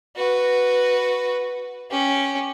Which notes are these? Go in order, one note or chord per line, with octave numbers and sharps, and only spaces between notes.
F#4 B4
C#4 G4